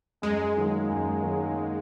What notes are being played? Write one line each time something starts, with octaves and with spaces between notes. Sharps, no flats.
F#2 G#3
D#3 F#3 A#3
F#2
D#3 F#3 A#3